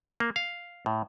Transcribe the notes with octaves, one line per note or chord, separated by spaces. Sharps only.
A#3
F5
A2